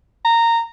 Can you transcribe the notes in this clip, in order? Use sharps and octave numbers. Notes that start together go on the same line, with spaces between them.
A#5